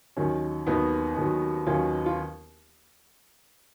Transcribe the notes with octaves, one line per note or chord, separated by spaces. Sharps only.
D#2 D#3 F#3 C#4
D#2 D#3 F#3 B3 D#4
D#2 D#3 F#3
D#2 D#3 F#3 C#4 F4
F4